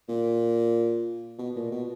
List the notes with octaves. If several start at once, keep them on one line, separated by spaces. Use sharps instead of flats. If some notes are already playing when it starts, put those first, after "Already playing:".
A#2
B2
A#2
B2